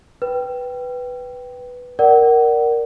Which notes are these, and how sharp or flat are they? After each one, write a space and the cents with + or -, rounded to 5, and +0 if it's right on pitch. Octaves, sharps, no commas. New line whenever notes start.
B4 +0 G5 -10
A#4 +0 D5 +0 F#5 +30